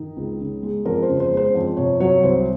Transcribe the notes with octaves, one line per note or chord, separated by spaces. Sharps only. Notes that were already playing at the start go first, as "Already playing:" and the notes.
Already playing: D#3 D#4
C#2
C#3
G#3
F2 A#4
C5
C#3
C5
G#3
C5
F2
C3 C#5
F#3 C#5
C2 C5